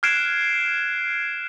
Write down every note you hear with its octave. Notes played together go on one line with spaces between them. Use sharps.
F6 F#6 G#6 C7 D7 E7